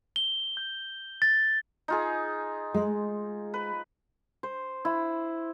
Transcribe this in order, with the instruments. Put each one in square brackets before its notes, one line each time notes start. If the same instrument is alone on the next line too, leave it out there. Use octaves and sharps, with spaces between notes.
[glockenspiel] G7
G6
A6
[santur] D#4 F4 G#4
[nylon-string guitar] G#3
[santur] B4
[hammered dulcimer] C5
E4